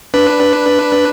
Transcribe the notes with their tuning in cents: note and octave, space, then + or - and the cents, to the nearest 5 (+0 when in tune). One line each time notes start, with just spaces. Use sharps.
D4 +0 B4 +0